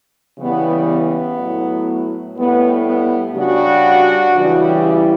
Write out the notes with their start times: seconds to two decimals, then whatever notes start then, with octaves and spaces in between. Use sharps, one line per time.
0.38 C#3 E3 G3 B3
0.88 B3
1.37 A2 F#3
2.37 A2 G3 B3
2.86 B3
3.35 C#3 G3 D4 F#4
4.35 C#3 E3 G3
4.84 C#4 E4